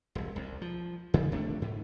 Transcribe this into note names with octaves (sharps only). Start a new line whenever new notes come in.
E1 C2
C2
F3
F#2 C#3 F3 G3
C3 A3 D4
G#2